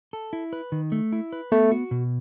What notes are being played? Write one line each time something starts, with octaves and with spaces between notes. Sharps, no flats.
A4
E4
B4
D#3
A3
E4
B4
A3 B3
F#4
B2